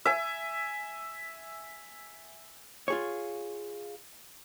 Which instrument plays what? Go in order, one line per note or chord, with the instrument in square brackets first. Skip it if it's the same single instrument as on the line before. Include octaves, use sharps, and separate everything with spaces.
[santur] E5 G#5
[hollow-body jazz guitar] F4 G#4 C#5